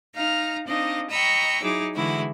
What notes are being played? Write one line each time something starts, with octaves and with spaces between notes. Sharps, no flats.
D#4 F5 A#5 F6
C4 D4 D#4 D#5 F5
D#5 G5 A#5 B5 C#6 E6
F#3 D#4 E4 G#4 D6
D3 E3 G#3 E4 F#4